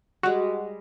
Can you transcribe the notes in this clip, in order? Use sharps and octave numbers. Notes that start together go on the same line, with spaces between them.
G3 G#3 F#4